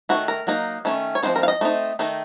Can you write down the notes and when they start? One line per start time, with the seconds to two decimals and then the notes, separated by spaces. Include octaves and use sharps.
0.09 D#3 F#3 A3 F#4
0.28 A#4
0.47 F#3 A#3 D#4
0.85 D#3 A3 C#4
1.15 C#5
1.23 F3 A3 C4 D#4 C5
1.36 A#4
1.43 F5
1.48 D#5
1.61 A3 C4 D#4
1.99 D#3 A3 D#4